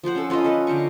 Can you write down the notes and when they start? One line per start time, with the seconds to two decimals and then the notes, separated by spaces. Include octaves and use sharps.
0.03 F3 F4 C5 F#5
0.15 C#4 A4
0.30 C#4 F4 B4 D#5
0.44 A4 B4
0.67 D3 C5 A#5 C#6